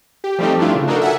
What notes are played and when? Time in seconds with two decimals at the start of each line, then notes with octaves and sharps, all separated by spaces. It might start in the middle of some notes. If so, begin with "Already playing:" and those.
0.24 G4
0.39 F3 G3 A3 C4 D#4 G4
0.58 G2 A3 D4 E4 F4
0.75 C#3
0.88 D4 D#4 F#4 A4 A#4
1.01 E5 F#5 G#5